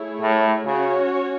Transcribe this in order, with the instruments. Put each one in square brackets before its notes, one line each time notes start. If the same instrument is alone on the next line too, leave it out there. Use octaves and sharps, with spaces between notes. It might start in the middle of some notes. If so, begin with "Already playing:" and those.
Already playing: [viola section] A3 E4 G#4 C#5
[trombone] A2
[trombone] C#3 [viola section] C#4 F#4 C#5